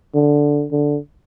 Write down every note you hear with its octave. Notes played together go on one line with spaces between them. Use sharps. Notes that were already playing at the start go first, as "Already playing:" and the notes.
D3
D3